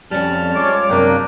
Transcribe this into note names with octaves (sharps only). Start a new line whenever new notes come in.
F2 G3 C#4 A5 F6
G#3 F4 C#5 D6
F#2 C3 A#3 D4 A#4 G5